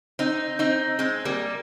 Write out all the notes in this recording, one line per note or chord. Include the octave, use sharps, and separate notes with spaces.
C4 D#4
C4 D#4
G#3 C4
G3 A#3